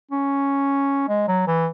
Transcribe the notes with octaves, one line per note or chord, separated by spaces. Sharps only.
C#4
G#3
F#3
E3